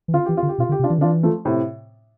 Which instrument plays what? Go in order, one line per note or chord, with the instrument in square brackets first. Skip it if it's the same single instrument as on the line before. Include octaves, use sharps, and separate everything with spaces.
[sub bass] E3
[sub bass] D3 [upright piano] F4
[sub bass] E3 [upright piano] G4
[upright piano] F4
[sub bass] D3
[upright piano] G4
[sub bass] B2 [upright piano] F4
[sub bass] D3
[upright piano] G4
[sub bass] C3
[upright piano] D4 F4
[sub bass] E3
D3
[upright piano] D4 F4
[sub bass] E3
[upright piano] F3 A3
A2 C3